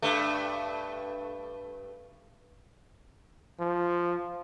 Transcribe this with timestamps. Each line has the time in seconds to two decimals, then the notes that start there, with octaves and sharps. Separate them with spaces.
0.02 G2 A3
3.60 F3